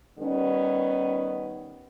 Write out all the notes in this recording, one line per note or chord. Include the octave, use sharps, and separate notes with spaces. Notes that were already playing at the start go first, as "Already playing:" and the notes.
D#3 G3 B3 C#4